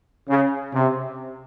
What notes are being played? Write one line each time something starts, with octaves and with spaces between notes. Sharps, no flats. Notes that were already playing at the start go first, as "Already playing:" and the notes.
C#3
C3